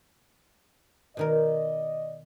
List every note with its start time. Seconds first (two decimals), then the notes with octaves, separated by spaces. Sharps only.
1.17 B2 D#3 A#4 D5 D#5